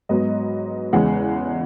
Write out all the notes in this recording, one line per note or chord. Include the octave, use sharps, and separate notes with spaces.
G#2 F#3 B3 D#5
E2 C#3 E3 G#3 F#5